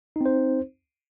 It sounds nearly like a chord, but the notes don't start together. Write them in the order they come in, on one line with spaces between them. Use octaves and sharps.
D#4 C4 C5